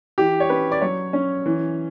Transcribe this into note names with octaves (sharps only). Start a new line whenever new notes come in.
E3 G4
C#5
C#4 B4
D5
F#3 C#5
C#4
E3